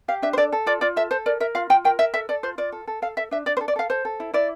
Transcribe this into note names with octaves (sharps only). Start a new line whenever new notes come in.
G4 F5
D4 E5
C5
A4 D5
A4
F4 D5
F4 D5
A4 E5
A4 C5
A#4 D5
A#4 E5
F4 F5
F4 G5
A#4 G5
A#4 E5
A4 E5
A4 D5
F4 C5
F4 D5
A4
A4
A4 F5
A4 E5
D4 E5
D4 D5
C5
A4
D5
A4 F5
A4 C5
A4
E4
E4 D5